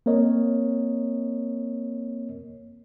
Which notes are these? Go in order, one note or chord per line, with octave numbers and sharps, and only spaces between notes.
A#3 C4 A#4 C#5 D#5